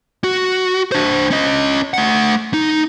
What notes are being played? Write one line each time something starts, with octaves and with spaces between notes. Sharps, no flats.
F#4
D4 C5
C#4 D#5
A3 F#5
D#4